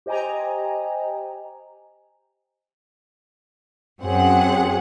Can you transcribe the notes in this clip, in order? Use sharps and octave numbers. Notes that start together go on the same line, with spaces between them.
G4 C5 D#5 G5 G#5 A#5
F#2 C4 G#4 F#5